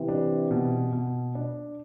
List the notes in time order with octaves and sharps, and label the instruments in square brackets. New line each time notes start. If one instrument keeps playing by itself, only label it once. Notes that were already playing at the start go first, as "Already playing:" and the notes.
Already playing: [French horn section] C3 E3
[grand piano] D4
B2
B2
D4